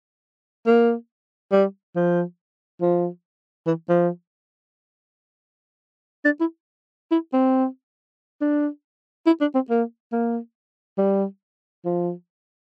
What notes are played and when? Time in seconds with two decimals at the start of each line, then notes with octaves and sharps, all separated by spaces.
0.67 A#3
1.52 G3
1.96 F3
2.81 F3
3.67 E3
3.89 F3
6.25 D4
6.40 E4
7.11 E4
7.33 C4
8.41 D4
9.26 E4
9.41 D4
9.55 C4
9.70 A#3
10.12 A#3
10.98 G3
11.85 F3